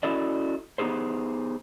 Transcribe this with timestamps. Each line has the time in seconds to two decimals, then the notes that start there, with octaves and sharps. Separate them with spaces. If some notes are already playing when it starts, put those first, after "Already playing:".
0.03 C#4 E4 F#4 A4 D5 D#5
0.78 B3 D#4 G4 G#4 C5